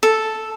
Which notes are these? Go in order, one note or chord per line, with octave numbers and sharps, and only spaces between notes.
A4